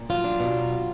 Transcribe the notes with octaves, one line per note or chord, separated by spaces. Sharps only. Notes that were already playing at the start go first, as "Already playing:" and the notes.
Already playing: A#2
F#3 F4
D4
B2
F#3